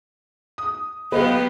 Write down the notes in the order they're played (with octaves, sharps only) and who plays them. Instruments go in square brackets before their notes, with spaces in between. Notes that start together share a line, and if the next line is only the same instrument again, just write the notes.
[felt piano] D#6
[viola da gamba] F#3 B3 G4 [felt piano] B4 D#5 F5